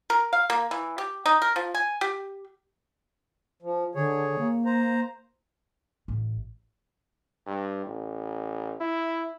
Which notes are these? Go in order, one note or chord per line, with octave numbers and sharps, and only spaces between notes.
A#4
F5
A#3
E3
G4
D#4
A#4
F3
G#5
G4
F3
D3 G#4 C#5
A#3
C5 A#5
A1
G2
A1
E4